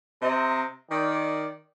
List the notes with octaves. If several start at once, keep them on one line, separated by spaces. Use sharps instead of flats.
C3 C5 D#5 E5 A#5
D#3 D5